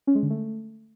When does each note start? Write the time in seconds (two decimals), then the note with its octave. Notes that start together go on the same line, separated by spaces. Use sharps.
0.07 C#4
0.15 G#3
0.23 D3
0.30 A3